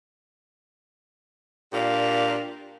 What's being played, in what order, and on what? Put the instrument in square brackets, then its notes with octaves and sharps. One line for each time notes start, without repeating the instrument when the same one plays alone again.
[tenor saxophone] A#2 [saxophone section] D4 G4 F5